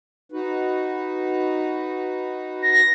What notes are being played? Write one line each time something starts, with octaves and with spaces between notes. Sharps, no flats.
D#4 F#4 B4
A#6